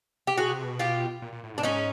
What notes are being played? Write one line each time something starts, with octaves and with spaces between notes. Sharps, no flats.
G4
B2 F#4 G#4
C3
B2
F4 G4
A#2
A#2
A2
G#2 D4
C#4 D#4